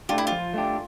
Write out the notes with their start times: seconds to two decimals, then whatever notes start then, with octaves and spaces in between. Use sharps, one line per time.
0.09 A3 D4 F4 G4
0.18 E4
0.27 F3 F4
0.54 A3 D4 G4